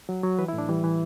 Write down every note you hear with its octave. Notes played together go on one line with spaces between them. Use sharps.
F#3
F#3
E3 B4
E4
A2
D4
E3 G3
E3